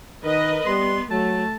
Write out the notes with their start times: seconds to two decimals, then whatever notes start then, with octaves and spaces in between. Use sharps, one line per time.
0.24 D#3 A#4 B4 D#5
0.66 G3 B3 C6
1.11 F#3 A3 A5